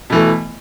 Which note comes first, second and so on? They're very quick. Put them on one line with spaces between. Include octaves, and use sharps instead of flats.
B2 E3 A3